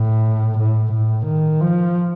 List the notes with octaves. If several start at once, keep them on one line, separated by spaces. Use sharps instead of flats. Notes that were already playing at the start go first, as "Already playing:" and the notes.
Already playing: A2
A2
A2
D#3
F3